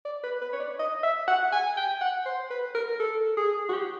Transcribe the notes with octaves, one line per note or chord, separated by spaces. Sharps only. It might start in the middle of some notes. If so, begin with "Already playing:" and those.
D5
B4
B4
C#5
D5
D#5
E5
F#5
G#5
G5
F#5
C5
B4
A#4
A4
G#4
F#4
G4